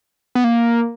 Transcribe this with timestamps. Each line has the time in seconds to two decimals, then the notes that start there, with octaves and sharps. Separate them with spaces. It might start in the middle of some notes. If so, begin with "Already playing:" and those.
0.35 B3
0.44 A#3